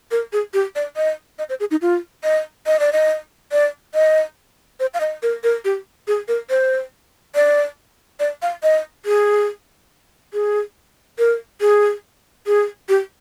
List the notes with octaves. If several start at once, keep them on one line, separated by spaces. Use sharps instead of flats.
A#4
G#4
G4
D5
D#5
D#5
C5
G#4
D#4
F4
D#5
D#5
D5
D#5
D5
D#5
C5
F5
D#5
A#4
A#4
G4
G#4
A#4
C5
D5
D5
F5
D#5
G#4
G#4
A#4
G#4
G#4
G4